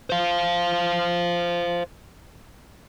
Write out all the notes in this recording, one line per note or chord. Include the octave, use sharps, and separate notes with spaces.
C5 F5